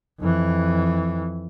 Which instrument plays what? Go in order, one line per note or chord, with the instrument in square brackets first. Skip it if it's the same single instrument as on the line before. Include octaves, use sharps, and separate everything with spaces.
[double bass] F2 E3